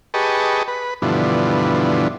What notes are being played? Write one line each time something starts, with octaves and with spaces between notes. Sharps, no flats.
G4 G#4 B4 D#5 A5 C#6
B4
G2 B2 D3 E3 F3